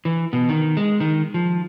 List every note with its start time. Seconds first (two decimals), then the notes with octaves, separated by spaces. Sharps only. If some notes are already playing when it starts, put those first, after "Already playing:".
0.05 E3
0.33 B2
0.49 D#3
0.77 G#3
1.00 D#3
1.34 F3